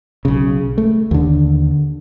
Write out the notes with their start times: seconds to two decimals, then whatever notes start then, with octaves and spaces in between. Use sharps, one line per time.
0.25 B1 C#3
0.78 A3
1.11 D#2 D3